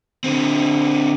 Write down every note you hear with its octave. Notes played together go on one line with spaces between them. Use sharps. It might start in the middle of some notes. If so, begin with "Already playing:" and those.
D3 C4